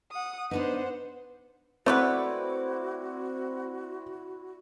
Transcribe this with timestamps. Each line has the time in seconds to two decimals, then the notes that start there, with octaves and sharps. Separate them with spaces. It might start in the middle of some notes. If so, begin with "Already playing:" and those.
0.12 F#5 D#6
0.51 B3 D4 D#4 B4 C5 F#5
1.86 A3 B3 C4 E4 F#4 B4 D5 F#5